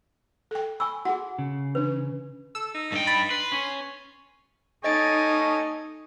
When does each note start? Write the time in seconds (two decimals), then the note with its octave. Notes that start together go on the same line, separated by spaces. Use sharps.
0.51 A4 G5
0.80 G#5 B5 C#6 E6
1.05 F#4 G#4 F#5
1.39 C#3
1.75 E3 D4 B4
2.55 A4 E6
2.74 D#4
2.92 G2 G5
3.07 B5 A6
3.31 B4 C6
3.52 C#4
4.84 D#4 A4 D#5 G#5 C#6 A6 D7